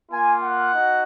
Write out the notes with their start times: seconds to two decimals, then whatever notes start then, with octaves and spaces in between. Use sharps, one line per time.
0.12 A#3 F4 G#5
0.42 F#5
0.74 D#4 F#4